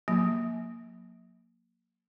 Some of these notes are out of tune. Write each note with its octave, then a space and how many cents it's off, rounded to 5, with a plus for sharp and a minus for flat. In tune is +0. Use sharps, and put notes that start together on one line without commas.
F#3 -40 A#3 +0